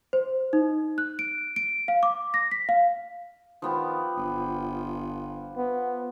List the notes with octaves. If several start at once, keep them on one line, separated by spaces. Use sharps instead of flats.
C5
D#4
F#6
D7
D7
F5
D6
A#6
B6
F5
D#3 F3 B3 G4
G1
B3